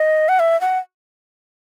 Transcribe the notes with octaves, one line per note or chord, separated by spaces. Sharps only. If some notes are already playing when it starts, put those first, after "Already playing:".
Already playing: D#5
F#5
E5
F#5